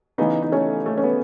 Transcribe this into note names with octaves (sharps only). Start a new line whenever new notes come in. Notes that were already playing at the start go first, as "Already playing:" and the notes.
C#3 E3 B3 D#4
D#4
A3 C#4
A3
C#4
B3